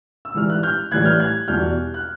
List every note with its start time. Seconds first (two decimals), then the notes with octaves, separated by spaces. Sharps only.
0.25 E6
0.34 G#2 E3 G3 F6
0.50 F#6
0.63 F6 G6
0.91 A2 E3 G3 F#6 G#6
1.05 F6 G6
1.20 F#6 G#6
1.48 E2 B2 G3 F6 G6
1.94 F#6